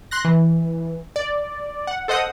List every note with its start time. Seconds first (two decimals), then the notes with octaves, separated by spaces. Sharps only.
0.11 C6 F#6 A#6
0.25 E3
1.16 D5
1.87 F#5
2.08 A4 C5 D#5 F#5 D#6